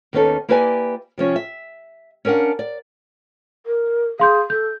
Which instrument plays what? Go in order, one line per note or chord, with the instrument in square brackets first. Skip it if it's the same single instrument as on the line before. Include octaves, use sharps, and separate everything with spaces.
[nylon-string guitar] D#2 D#3 B3 C#4 D#4 A4
A#3 E4 G4 B4 D5 G#5
C3 F3 C#4
E5
C#4 D4 A#4 F5 F#5
D5
[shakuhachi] A#4
[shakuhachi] G#4 [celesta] F5 C6 G6
[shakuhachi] A4 [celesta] G6